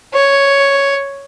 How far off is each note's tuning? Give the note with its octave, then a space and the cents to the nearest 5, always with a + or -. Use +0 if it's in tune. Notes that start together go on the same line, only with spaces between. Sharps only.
C#5 +0